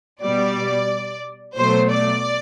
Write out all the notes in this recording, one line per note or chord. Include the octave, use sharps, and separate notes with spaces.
B2 G3 D5
B2 F#3 A3 C5
D5